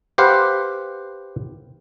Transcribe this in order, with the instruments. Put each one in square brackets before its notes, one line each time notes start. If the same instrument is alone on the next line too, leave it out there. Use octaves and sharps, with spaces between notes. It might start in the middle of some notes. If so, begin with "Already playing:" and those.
[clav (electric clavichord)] G4 B4 C5 F5 F#5